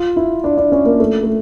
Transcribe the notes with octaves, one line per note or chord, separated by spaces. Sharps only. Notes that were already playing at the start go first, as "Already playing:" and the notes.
Already playing: F4
E4
D4
D4
C#4
A#3
A3
A3